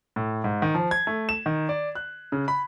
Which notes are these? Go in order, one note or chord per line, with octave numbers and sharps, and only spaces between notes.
A2
G#2
D#3
F3
G#6
A3
E7
D#3
D5
F#6
C#3
B5